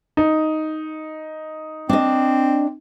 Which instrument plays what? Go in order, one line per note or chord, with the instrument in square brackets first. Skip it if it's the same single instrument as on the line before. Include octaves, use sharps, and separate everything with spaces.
[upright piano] D#4
[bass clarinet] C4 [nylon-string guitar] D4 D#5